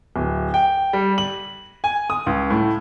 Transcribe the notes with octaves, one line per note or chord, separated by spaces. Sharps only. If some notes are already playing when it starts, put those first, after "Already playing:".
D1
G5
G3
F#7
G#5
D#6
C#2
A2